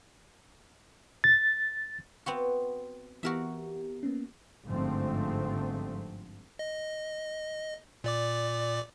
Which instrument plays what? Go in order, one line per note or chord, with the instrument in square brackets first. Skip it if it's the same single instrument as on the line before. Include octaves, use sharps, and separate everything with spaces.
[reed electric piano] A6
[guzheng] B3 C4 F#4
[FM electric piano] E3 B3 G4 [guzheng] F#4 A#4 E5
[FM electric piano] A#3 B3 C#4
[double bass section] G1 G#2 D3 F3 A3 C4
[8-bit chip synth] D#5
A#2 D5 D6